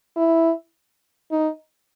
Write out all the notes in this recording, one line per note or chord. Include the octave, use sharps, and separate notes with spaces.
E4
D#4